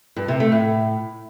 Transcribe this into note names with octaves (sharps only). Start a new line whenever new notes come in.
G2
C3
A3
A2